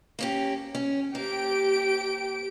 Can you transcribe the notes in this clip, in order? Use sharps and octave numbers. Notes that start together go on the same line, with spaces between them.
A#3 C#4 G4
C#4
A#3 G4 D7